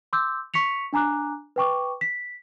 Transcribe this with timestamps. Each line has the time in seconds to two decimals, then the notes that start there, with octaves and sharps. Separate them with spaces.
0.13 C6 D6 E6 G6
0.54 C#6 B6 C#7 F7
0.93 D4 G#5 A#5 D6 F#6
1.56 B4 G5 C#6 D6
2.01 B6